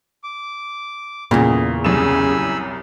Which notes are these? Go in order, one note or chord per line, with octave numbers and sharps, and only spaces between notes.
D6
E2 A#2 C#3
C2 F#2 G#5 B5 E6 E7